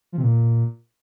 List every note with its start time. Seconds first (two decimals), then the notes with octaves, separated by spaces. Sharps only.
0.12 F3
0.18 C3
0.23 A#2